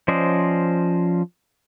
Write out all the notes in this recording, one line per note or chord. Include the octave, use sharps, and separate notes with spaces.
F3 C#4 C5 D5 D#5